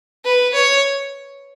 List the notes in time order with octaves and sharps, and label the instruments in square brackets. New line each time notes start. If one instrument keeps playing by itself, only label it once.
[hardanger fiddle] B4
C#5